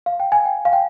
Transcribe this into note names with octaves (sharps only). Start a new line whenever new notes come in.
F5
G5
G#5
G5
F5
G5